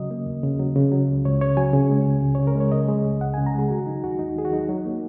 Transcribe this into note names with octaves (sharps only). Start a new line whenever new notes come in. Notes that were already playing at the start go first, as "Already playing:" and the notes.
Already playing: C#3 F#3 D#5
A#3
D#2
C#3
F#3
C#3
F#3
C#2
C#2 C#5
C#3 C#5
F#3 G#5
C#3
G#3
C#2
C#2
C#5
C#3
A#4
G#3 C#5
C#3 D#5
G#3
C#2
C#2 F#5
G#5
C#3
A#5
G#3 G#4
D#3 F#4
F#3 D#4
D#2 F#4
D#2 D#4
D#3 G#4
F#4
F#3 D#4
F#3
A#3